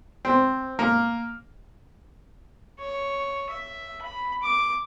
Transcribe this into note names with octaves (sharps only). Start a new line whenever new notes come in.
C4
A#3
C#5
E5
B5
D6